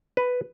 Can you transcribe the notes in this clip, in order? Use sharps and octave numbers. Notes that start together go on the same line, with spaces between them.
B4